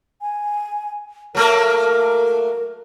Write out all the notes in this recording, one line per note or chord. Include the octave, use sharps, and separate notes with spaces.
G#5
F#3 A3 A#3 A#4